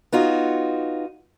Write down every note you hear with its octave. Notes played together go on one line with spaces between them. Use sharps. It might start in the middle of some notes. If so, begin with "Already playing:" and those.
B3 D#4 F4 F#4